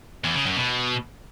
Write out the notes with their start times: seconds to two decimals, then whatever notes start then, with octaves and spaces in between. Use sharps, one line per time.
0.24 E2
0.35 C#3
0.45 F#2
0.56 B2